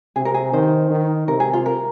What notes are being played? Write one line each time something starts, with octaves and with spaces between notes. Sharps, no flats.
C3 G#4
A#4
G#4
D#3 C5
D#3
C3 A#4
G#4
F4
A#4